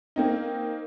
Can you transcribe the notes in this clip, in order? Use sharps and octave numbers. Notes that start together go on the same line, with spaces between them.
A#3 C4 D#4